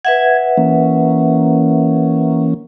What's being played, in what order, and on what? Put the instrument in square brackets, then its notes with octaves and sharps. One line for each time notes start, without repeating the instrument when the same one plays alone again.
[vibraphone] B4 E5 F#5 [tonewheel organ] G#6
[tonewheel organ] E3 A#3 C#4